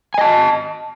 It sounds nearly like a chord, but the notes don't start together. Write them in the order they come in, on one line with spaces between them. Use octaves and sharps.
G#5 D#5 A5